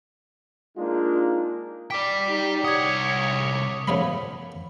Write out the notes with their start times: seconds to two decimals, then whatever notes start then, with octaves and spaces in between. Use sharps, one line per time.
0.78 G#3 A#3 D4 D#4 F4
1.91 D5 G5 D6 B6
2.28 D#4 G4
2.64 C2 C#5 F#5 D#6 G#6
3.88 F#2 C#3 F3 A3 B3 B5